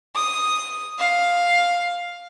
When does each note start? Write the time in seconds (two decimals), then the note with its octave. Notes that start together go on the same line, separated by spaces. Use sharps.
0.15 D#6
0.99 F5